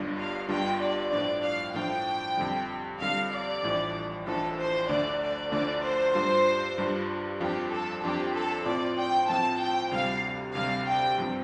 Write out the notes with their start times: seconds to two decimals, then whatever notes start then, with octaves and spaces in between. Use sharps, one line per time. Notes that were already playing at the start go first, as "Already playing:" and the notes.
Already playing: G1 G2 G3 D4 F4
0.18 F5
0.49 G1 G2 G3 D4 F4 G5
0.80 D5
1.11 A2 F3 D4 D5
1.44 F5
1.74 A2 F3 D4 G5
2.37 F2 D3 G3
3.00 F2 D3 G3 F5
3.32 D5
3.63 A1 A2 F3 D4
4.26 A1 A2 F3 D4 A4
4.58 C5
4.89 D2 D3 F3 A3 D4 D5
5.21 D5
5.51 D2 D3 F3 A3 D4 D5
5.83 C5
6.15 G2 G3 D4 F4
6.78 G2 G3 D4 F4
7.40 F2 F3 D4 F4 G4
7.71 A4
8.03 F2 F3 D4 F4 G4
8.35 A4
8.66 A2 F3 C4 F4 D5
8.98 G5
9.29 A2 F3 C4 F4 A5
9.60 G5
9.91 D2 C3 G3 F5
10.55 D2 C3 G3 F5
10.86 G5
11.18 G2 F3 C4 F4